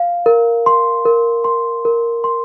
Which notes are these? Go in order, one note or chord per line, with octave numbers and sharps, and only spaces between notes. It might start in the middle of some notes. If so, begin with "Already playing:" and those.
Already playing: F5
A#4
C6
A#4
C6
A#4
C6